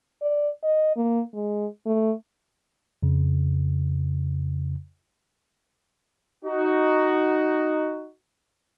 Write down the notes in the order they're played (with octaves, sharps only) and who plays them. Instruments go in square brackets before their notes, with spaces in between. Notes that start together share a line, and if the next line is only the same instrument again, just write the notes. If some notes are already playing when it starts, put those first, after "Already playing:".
[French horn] D5
D#5
A#3
G#3
A3
[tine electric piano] F2 C#3
[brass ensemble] D#4 F#4